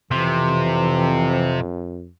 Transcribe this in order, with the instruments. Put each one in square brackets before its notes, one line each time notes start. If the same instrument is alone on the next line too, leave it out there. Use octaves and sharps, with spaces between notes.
[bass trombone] F2 [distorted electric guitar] C3 [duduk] E3